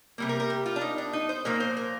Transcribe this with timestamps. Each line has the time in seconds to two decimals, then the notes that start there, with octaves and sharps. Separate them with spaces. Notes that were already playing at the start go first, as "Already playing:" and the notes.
0.18 C3 G3 A#3
0.29 A#4
0.40 A#4
0.50 G4
0.66 F4
0.76 D4
0.81 D#4
0.98 D4
1.13 D#4
1.29 C5
1.45 A#2 F3 A#3 A#4
1.60 C5
1.77 A#4